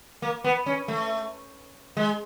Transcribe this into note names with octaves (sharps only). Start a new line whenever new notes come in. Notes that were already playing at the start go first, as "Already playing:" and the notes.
A#3
B3
C#4
A3
G#3